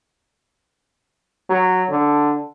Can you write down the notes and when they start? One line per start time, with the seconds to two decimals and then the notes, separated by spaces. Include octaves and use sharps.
1.49 F#3
1.90 D3